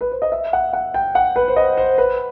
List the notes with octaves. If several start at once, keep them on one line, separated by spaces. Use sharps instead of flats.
B4
C5
D#5
E5
F#5
F#5
G5
F#5
B4
C5
D#5
C5
B4